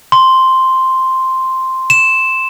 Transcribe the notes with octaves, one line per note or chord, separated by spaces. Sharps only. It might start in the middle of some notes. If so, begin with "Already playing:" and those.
C6
E7